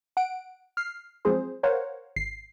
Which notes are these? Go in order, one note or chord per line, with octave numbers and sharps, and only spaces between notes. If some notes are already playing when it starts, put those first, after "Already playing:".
F#5 D7
F6 C7
F3 F#3 G#3 C4 G#4 C5
A#4 C5 C#5 F5 F#5
G#1 C7